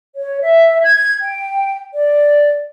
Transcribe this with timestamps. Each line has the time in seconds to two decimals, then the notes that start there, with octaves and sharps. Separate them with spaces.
0.16 C#5
0.41 E5
0.82 G#6
1.21 G5
1.94 D5